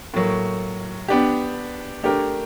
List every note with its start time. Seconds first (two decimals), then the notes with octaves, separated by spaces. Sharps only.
0.14 A2 F#3 A#3
1.08 B3 D4 G4
2.03 A3 D4 G4 A#4